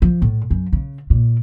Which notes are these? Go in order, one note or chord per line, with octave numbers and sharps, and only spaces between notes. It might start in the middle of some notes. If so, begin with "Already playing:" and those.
F3
A2
F#2
C#3
A#2